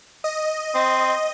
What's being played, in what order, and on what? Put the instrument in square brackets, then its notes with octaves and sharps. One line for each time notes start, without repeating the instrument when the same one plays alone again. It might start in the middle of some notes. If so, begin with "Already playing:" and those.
[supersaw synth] D#5
[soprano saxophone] C4